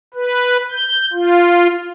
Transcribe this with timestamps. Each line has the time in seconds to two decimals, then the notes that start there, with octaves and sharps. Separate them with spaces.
0.14 B4
0.71 G6
1.13 F4